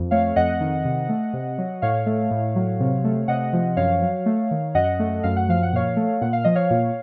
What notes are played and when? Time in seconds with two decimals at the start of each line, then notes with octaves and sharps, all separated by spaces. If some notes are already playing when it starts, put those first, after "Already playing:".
Already playing: F2
0.11 A3 C#5 F5
0.36 F2 D#5 F#5
0.61 D#3
0.85 C3
1.09 A3
1.33 C3
1.58 F#3
1.82 A2 C#5 F5
2.06 A3
2.31 A2
2.56 F#3
2.80 C3
3.04 A3
3.28 C3 D#5 F#5
3.53 F3
3.77 F#2 C#5 F5
4.02 F#3
4.26 A3
4.51 D#3
4.75 F#2 D#5 F#5
5.00 A3
5.23 F#2 F5
5.36 F#5
5.49 F3 F5
5.63 F#5
5.73 A#2 C#5 F5
5.97 A3
6.21 A#2 F#5
6.33 F5
6.44 F3 D#5
6.55 C#5 F5
6.70 A#2